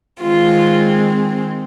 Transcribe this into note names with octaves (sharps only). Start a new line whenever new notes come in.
D#3 G#3 C4 F4